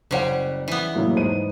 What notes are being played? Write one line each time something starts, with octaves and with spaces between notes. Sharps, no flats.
F#1 C#3 G3 C5 F#5
E3 B3
A2 F#3 A#3
G#2 C5 D#7